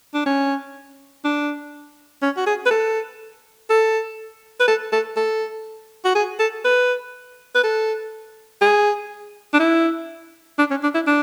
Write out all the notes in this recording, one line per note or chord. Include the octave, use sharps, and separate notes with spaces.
D4
C#4
D4
C#4
F#4
G#4
B4
A4
A4
B4
A4
A4
A4
F#4
G#4
A4
B4
B4
A4
G#4
D4
E4
D4
C#4
D4
E4
D4